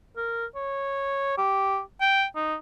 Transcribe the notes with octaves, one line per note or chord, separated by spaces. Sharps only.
A#4
C#5
G4
G5
D#4